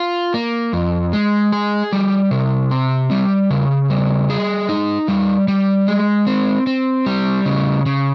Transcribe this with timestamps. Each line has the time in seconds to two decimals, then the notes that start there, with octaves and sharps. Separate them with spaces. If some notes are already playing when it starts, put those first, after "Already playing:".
Already playing: F4
0.34 A#3
0.73 F2
1.13 G#3
1.53 G#4
1.93 G3
2.31 C3
2.71 C4
3.11 G3
3.50 C#3
3.90 G3
4.30 G#4
4.69 D#4
5.08 G3
5.48 G3
5.88 G#3
6.27 C4
6.67 C4
7.06 G3
7.46 C#3
7.86 C#3